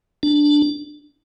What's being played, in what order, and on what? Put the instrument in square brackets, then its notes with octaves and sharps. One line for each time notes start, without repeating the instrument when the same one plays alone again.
[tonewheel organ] D4